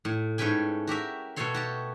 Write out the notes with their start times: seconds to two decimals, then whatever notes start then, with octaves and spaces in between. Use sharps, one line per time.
0.05 A2
0.38 G#2 A3 C#4 B4 G5 G#5
0.87 F#4 G4 A#4 E5
1.36 B2 A3 B3 A4 C#5 C6
1.54 F#4 G4 A5